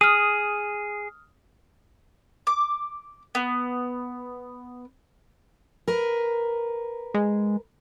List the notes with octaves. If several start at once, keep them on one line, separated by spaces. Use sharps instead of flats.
G#4 D#6 F6
D6
B3
A#4 B4
G#3